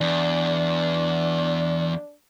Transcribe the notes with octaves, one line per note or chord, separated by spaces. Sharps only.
E2 D4